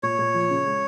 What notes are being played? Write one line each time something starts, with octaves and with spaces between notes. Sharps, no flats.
A#2 C#5
A#2
F3
C#3
G#3